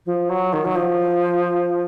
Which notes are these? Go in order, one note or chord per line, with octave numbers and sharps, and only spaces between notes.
F3
F#3
D#3
F#3
F3